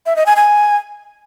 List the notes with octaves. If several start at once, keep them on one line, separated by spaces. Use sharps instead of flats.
E5
D#5
G#5
G#5